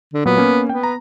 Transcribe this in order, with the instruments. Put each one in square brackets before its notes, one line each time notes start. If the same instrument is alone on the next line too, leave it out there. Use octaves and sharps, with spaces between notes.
[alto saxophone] D3
[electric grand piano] A#2 F#3 [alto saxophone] B3
[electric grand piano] A#3 C#4
[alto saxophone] B3 [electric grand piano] G5
[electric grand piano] A#5